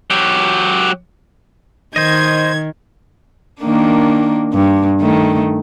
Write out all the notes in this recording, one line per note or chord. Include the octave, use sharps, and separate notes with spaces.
F#3 G4
D#3 C5 D#5 G#6
D#3 A#3 D4
G2
D#3 A3